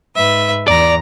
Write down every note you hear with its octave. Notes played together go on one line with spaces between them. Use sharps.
G#2 B4 E5
E2 D5 A#5